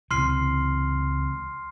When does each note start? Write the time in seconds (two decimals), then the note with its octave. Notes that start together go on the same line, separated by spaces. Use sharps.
0.11 C#2 C3 E3 C6 F6 C7